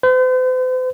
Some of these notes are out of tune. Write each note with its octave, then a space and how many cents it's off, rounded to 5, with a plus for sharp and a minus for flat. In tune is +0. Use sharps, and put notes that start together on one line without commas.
C5 -45